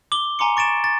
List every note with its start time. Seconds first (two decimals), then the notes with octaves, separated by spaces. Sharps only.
0.12 D6 F#7 G7
0.39 G#5 A#5 C6 D6 C#7
0.57 C#6 A6 D7 E7
0.84 A6